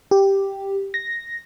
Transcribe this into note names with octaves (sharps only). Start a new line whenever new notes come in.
G4
A#6